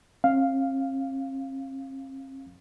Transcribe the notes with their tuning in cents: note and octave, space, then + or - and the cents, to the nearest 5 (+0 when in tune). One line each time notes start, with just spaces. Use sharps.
C4 +45 F5 +0